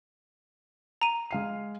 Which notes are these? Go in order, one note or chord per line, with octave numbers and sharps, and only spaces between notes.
A#5 D#7
G#3 F5 C7